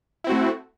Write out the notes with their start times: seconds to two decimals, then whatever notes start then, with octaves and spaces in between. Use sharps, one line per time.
0.24 E4
0.27 C4
0.29 F#4
0.32 A3